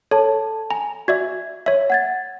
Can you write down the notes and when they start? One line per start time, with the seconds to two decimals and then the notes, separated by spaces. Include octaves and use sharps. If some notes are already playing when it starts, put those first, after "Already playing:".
0.11 A4 C#5 A5
0.71 G#5 A#5
1.08 F#4 D5 E5 G#6
1.66 C#5 E5
1.90 F#5 G#6 A6